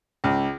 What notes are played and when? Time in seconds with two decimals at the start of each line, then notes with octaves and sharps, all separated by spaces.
0.24 C#2